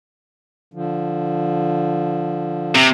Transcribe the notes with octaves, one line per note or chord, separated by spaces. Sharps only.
D3 F3
C3